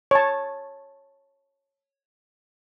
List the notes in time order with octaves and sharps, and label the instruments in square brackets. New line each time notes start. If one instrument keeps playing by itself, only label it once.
[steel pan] C#5 A5